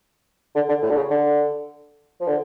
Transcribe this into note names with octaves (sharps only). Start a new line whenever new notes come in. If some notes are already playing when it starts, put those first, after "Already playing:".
D3
D3
A2
D3
C#3
D3
F3
D3